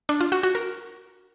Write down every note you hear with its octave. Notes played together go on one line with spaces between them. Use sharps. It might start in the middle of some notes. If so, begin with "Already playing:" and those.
D4
F4
F#4
F#4
A#4